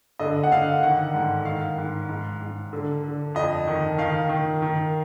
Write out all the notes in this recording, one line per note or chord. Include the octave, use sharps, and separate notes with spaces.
D3 D#5
F#5
D3 F5
D#3 F#5
G#2
D#3 F5
G#2
G#2
G#2
D3
D3
F2 D#5
D#3
D#3 F5
D#3
D#3